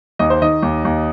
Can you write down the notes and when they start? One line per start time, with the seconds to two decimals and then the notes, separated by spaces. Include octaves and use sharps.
0.19 D#2 D#5
0.30 C5
0.42 D#3 D#5
0.62 D#2
0.85 D#2